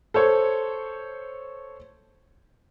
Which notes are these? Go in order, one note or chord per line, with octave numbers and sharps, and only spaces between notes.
A4 C5 C#5